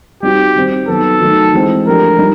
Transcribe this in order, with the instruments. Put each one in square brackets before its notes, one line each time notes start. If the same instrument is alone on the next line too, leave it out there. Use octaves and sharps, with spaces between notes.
[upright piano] G3 C4 D#4 F#4 [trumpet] G4
[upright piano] D#3 G3 C4
[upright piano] D#3 F#3 B3 [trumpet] A4
[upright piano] D#3 F#3 A3
E3 G#3 C4
[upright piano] F3 A3 D4 G4 [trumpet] A#4
[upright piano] G3 D#4